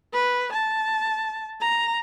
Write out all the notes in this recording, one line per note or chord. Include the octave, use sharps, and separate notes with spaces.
B4
A5
A#5